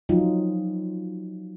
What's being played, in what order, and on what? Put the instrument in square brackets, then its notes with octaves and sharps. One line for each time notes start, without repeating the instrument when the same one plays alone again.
[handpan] F3 F#3 D#4 F4